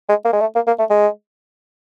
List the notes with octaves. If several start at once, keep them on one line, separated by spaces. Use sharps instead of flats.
G#3
A#3
G#3
A3
A#3
A#3
A3
G#3